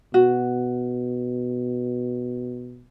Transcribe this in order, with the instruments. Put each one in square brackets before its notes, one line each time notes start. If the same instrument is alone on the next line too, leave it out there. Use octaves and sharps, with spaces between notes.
[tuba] B2 [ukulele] F#4